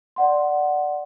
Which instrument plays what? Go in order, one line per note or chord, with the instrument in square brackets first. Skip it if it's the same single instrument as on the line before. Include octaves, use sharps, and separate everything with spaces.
[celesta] D5 F#5 C6